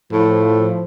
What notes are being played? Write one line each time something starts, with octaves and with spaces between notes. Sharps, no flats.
A2 F3